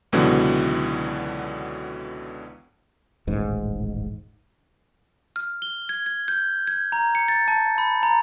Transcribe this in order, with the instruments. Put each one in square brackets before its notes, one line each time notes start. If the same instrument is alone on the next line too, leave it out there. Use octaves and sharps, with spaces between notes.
[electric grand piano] C#2 B2 D3 E3 F#3
[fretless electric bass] D#1 A1 G#2
[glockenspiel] F6
G7
G#6
G#6
G6
G#6
A#5
C#7
A6
A5
B5
A#5